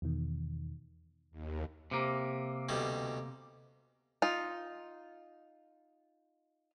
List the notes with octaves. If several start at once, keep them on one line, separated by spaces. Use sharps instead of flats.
E2 B2 D#3
D#2
C3 A#3
D2 B2 G3
D#4 F4